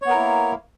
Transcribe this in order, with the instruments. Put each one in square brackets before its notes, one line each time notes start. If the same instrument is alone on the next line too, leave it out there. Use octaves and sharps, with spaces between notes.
[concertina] C#5
B3
A#4
E4
A#3